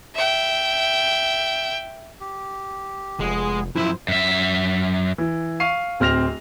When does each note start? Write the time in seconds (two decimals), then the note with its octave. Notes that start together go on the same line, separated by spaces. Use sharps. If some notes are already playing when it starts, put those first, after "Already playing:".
0.15 E5 G5
2.20 G4
3.20 F1 G#3 B3 G#4
3.75 F#2 F3 E4 C5
4.08 F#2 E5
5.18 E3
5.60 F5 C#6 C7 D#7
6.00 D1 C4 F6 A#6 F7